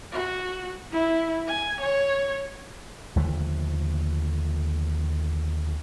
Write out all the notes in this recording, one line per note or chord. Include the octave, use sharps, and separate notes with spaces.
F#4
E4
G#5
C#5
D#2 D3 F3 A3